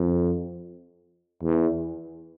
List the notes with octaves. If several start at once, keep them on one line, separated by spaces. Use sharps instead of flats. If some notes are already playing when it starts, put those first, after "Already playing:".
Already playing: F2
E2